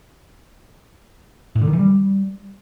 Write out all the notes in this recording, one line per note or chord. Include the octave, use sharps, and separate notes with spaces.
A2
D3
D#3
E3
G3